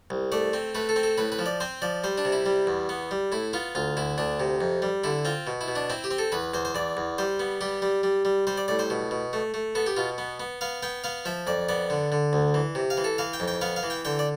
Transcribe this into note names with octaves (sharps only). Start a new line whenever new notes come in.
C2
A3 D5
C4
A3 B4
A4
C4
A4
A2 B4
B4
F3
D5
C4 C5
F3 D5
G3 C5
D4
C3
E4
G3
E2
B3
G3
A2 E4
B3 F4
D2 F4
D2 E4
D2 D4
C3
F2
G3
D3 E4
C4 F4
B2
E4
B2
D4
C4 E4
G4
C4
A4
E2 B4
E2 C5
C5
E2 D5
E2
G3 C5
B3
G3 G4
G3
G3
G3
G3 C5
D5
A2 D5
C5
B2
B2
A3
A3
B3 A4
G4
B2 F4
B3
B3
B3 F5
B3 G5
B3 F5
F3 E5
F2 D5
B3 D5
D3
D3
D2
E3
C3
F5
E3
A4
E3 F5
G5
F2
G5
B3 F5
F5
E3
G5
D3 G5
D5